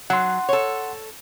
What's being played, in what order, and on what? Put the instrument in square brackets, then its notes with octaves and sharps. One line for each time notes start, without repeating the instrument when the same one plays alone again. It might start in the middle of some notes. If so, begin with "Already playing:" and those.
[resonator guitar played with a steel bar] F#3 [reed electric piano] F#5 C6
[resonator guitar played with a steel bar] A4 C#5